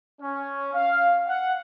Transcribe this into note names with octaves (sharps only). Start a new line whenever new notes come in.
C#4
F5
F#5